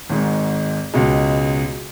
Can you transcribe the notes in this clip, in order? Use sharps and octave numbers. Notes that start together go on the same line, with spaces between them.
G#1 G#2 G#3
C#2 B2 G#3